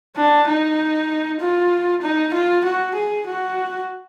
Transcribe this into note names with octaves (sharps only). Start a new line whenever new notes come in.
D4
D#4
F4
D#4
F4
F#4
G#4
F#4